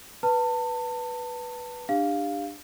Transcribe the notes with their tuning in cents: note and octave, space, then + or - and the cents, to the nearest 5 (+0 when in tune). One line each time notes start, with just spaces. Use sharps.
B4 -5 A5 +30
D4 +15 G4 +25 F5 +0